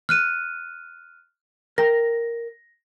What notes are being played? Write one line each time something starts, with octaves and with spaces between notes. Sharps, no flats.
F6 F#6 D#7
A#4 G5 A#6